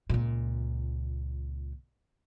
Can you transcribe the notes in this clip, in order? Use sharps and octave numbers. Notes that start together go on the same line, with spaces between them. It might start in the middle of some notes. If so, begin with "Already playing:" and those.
C#2 A#2